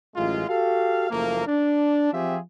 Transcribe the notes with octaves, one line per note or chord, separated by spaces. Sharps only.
A1 F#2 G#3 F4
F#4 G4 A4 F5
F#1 F3 A3 A#3
D4
F3 C4 F4 G4 G#4 E5